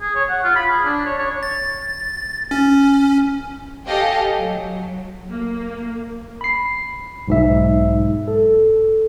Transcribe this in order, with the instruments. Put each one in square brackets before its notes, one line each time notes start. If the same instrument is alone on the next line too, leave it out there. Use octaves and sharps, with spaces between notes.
[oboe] G#4
C#5
F#5
F4
B5
G#4
D4
C#5
C#5
[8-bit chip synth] A6
C#4
[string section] G4 A4 D#5 F5 G5 G#5
F#3
A#3
[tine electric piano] B5 C7
B1 G#2 E5
A4